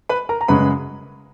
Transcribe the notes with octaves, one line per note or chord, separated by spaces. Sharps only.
B4 B5
A#4 A#5
A#5
F#2 C#3 G#3 B4 B5